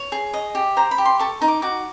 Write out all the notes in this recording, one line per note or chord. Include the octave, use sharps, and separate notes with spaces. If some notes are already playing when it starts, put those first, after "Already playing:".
Already playing: C#5
G#4
D#5
G4
C5 A#5
B5
G4
C6
A4 C#6
D#4
D6
F#4 D6